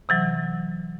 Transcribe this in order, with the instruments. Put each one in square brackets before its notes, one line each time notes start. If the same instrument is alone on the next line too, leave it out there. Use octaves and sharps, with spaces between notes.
[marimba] C3 E3 F#3